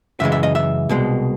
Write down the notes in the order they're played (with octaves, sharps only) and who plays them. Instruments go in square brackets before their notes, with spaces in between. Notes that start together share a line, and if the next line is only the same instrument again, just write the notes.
[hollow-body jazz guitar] F#2 C#3 E3 G#3 E5
E5
D#5
E5
C2 B2 G#3